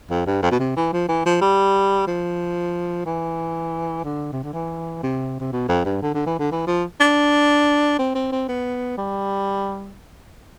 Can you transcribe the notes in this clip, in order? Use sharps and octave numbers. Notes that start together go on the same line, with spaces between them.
F2
G2
F2
B2
C3
E3
F3
E3
F3
G3
F3
E3
D3
C3
D3
E3
C3
C3
B2
F2
G2
D3
D3
E3
D3
E3
F3
D4
C4
C4
C4
B3
G3